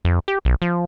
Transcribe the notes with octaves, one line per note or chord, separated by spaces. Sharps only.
F2
G4
B1
F3